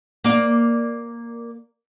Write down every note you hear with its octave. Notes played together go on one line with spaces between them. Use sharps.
A#3 D5